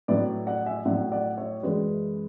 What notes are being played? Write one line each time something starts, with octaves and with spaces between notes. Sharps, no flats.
A2 F#3 B4 D5
D5 F#5
E5 G#5
A2 F#3 D5 F#5
D5 F#5
C#5 E5
F#2 E3 G#3 B4 D5